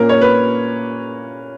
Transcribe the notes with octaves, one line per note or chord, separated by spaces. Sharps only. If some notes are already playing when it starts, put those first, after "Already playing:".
Already playing: A#2 A#3 C#4 A#4
C#5
B4